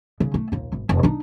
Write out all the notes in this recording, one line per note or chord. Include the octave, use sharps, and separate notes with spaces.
C#3
A3
A#1 D#2
G#1
F1
D4 D#4